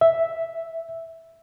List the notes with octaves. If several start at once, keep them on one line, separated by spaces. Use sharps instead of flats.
E5